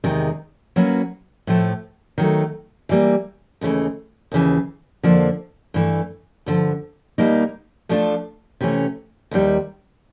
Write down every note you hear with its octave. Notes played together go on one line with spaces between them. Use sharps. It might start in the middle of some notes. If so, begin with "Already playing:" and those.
E2 C3 D#3 G#3
F#3 A#3 C#4 F#4 B4
A2 F3 A3
D#3 F#3 A3
E3 G3 A#3
D#2 C#3 E3 A3
D#2 C#3 E3
F2 D3 F3 A#3 D4
G2 E3 A3
G2 D3 F3
B2 G3 A#3 D#4
F3 A3 D4 F4 A4
C3 E3 A3 C#4
D#2 D#3 G3